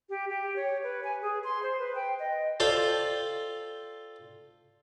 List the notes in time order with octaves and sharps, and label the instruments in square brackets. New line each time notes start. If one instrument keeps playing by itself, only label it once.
[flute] G4
G4
C#5
B4
G#5
G#4
C6
C5
B4
G5
D#5
[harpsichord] F4 A4 C5 D5 F5 G5